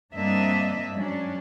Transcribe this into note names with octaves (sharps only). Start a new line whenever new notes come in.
G2 A#3 C4 D4 D#5 E5
G#2 F#3 C#4 D4